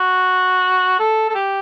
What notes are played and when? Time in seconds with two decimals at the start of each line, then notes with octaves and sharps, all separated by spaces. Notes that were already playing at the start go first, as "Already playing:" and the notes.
Already playing: F#4
0.99 A4
1.29 A4
1.35 G4